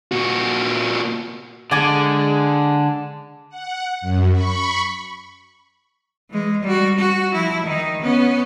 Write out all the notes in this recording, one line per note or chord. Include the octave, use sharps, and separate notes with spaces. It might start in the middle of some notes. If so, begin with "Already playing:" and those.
A#2 F#4
D3 G#3 D5 G#5 D6
F#5
F#2
B5 C#6
E3 G#3
G3 F#4
F#4
F3 E4
D#3 D#4
B3 C#4